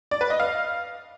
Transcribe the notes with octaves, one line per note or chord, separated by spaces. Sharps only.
D5
B4
D#5
F5